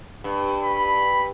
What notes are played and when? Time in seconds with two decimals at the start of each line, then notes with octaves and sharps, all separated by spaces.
0.24 G2
0.63 B5